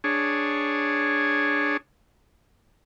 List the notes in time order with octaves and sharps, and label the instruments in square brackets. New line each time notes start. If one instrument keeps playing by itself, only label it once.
[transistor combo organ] D4 G#4 C#5